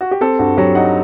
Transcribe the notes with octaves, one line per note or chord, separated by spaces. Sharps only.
F#4
G4
C4 A4
G2 F#4
F#3 G4
D#4 F#5